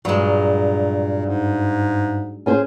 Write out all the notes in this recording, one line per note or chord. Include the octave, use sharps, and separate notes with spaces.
G2 A#2 F#3 G#3
G#2
C#4 G#4 C5